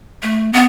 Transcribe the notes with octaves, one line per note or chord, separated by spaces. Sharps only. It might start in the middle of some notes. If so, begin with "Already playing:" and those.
A3
B3